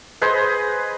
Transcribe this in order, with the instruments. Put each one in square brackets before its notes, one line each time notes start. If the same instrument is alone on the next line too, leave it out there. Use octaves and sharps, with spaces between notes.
[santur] G#4 B4 C5 D#5